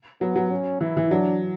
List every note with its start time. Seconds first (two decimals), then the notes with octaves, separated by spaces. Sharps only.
0.21 F#3 B3
0.36 F#3
0.51 C#4
0.81 E3 E4
0.97 E3
1.11 F#3 D4